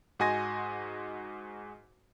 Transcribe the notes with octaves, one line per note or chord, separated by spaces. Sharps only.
G#2 F#4 D#5 G#5 C6 A#6